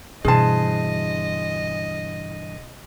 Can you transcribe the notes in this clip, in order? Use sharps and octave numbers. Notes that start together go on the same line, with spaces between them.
G2 B2 D3 E3 G#4 C5 D#5 A5